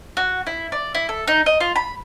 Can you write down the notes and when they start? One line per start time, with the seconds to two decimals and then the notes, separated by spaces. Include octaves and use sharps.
0.17 F#4
0.47 E4
0.72 D5
0.95 E4
1.09 A4
1.28 D#4
1.46 D#5
1.60 F4
1.76 B5